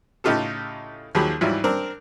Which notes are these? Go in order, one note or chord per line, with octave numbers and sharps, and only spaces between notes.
A2 C#3 D#4 F4 G4 A4
D#2 F3 F#3 G4 G#4 B5
G#2 E3 F#3 G3 E4 F4
C4 D4 A#4